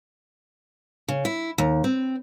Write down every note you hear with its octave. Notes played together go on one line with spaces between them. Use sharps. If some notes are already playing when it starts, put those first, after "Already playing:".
C#3
E4
D#2
C4